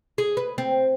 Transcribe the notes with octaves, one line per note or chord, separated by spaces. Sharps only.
G#4
B4
C4